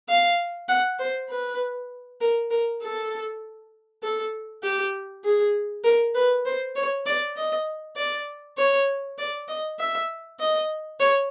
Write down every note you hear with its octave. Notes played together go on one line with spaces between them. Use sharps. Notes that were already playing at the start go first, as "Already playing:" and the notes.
F5
F#5
C5
B4
A#4
A#4
A4
A4
G4
G#4
A#4
B4
C5
C#5
D5
D#5
D5
C#5
D5
D#5
E5
D#5
C#5